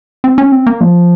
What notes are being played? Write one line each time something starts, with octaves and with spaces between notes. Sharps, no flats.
C4
C#4
C4
A#3
F3